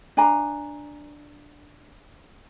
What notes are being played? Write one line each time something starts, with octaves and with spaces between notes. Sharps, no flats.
D4 G#5 A#5